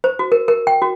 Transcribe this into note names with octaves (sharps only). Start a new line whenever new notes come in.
C5
F#4
A#4
A#4
G5
F#4